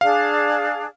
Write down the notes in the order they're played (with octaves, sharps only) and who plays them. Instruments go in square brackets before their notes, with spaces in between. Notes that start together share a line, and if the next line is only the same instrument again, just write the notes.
[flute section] D4 G#4 [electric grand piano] F5